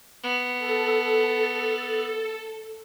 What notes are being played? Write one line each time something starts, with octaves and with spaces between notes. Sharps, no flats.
B3
A4